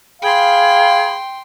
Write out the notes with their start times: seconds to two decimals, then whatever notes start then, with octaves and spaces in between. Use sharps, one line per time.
0.22 G#4 F5 G5 B5 C6